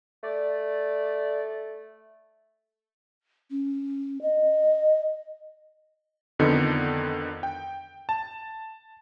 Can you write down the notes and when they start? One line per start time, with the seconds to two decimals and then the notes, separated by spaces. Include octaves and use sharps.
0.23 A3 D5
3.51 C#4
4.22 D#5
6.39 F2 D3 D#3 B3 D#4
7.43 G5
8.09 A5